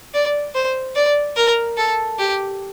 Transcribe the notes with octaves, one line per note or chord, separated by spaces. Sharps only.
D5
C5
D5
A#4
A4
G4